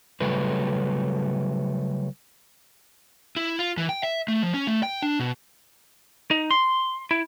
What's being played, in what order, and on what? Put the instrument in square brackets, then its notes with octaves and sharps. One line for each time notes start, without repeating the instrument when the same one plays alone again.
[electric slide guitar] C#3 F#3 G3 A3 B4
[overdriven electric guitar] E4
F4
E3
G5
E5
A3
F3
C#4
A3
G5
D4
B2
[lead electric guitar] D#4
C6
E4